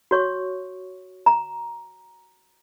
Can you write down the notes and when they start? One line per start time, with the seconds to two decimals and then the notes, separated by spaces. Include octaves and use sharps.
0.11 F#4 C#5 C#6
1.26 A#5